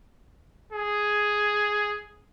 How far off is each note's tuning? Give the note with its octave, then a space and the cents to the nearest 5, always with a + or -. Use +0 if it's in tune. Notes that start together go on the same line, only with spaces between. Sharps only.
G#4 +5